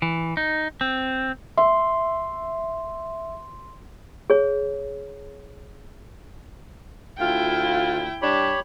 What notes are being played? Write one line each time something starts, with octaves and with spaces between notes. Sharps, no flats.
E3
D#4
C4
E5 C6
G#4 C#5
D2 E4 F4 G5
G3 D4 G4 C#5 B5